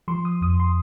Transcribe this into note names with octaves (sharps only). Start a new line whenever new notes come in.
F3 C6
D#6
F2 D#6
C6